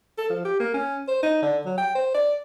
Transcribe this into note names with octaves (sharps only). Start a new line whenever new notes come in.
A4
F3
G4
A#3
C#4
C5
D#4
D3
F#3
G5
C5
D5